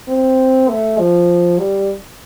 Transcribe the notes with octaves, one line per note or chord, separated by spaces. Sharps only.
C4
A3
F3
G3